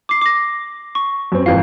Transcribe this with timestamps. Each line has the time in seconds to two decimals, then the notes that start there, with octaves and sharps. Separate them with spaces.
0.09 D6 C7
0.22 D6 A#6
0.95 C#6
1.32 F#2 C4
1.46 G#1 F2 E3 F5